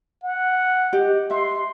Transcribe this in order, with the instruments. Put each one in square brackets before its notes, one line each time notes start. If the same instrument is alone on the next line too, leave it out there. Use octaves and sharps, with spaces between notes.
[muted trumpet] F#5
[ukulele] G4 D#5
[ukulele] E5 [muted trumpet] C6